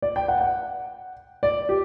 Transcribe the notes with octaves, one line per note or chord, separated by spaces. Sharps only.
D5
G5
F#5
F#5
D5
G4